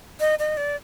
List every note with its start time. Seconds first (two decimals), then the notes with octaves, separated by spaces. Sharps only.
0.20 D#5
0.39 D#5
0.57 D5